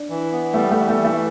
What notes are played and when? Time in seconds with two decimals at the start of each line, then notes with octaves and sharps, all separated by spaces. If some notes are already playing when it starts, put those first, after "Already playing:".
Already playing: D4
0.10 E3
0.32 B3
0.54 G3 A3
0.71 A3
0.77 E3
0.88 A3
1.00 E3
1.05 A3